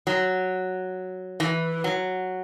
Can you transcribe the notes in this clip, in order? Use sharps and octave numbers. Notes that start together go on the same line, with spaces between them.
F#3
E3
F#3